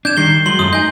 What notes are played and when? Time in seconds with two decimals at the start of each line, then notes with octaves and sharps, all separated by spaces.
0.05 D4 G6 G#6 E7
0.17 D#3 G3 C7 G7
0.46 F#3 G#3 C6 F#7 G7
0.59 F#2 A3 F4 D#6
0.73 D#4 D#5 G#5 G6